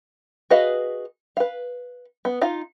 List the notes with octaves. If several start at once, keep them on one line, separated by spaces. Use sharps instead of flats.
F#4 G#4 B4 D#5 F5
B4 F5
B3
D#4 F4 F5